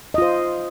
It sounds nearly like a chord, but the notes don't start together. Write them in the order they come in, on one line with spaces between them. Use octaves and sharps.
D#5 F4 C5